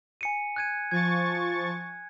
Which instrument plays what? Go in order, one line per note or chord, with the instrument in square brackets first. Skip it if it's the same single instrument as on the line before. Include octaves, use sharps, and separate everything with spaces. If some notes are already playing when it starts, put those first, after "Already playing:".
[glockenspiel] G#5 C#7 D#7
F#6 G#6 D#7
[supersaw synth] F3 C#6 A6 [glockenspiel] G#6